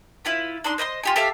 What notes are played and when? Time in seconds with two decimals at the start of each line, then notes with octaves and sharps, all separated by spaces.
0.25 E4 F4 B4
0.64 D4 D#4 C6
0.78 C5 D#5 E5 C6
1.03 F4 G4 G#5
1.16 G4 A4 E5 F5